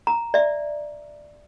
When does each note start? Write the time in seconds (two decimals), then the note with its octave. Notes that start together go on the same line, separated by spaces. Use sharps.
0.07 A#5
0.34 D5 E5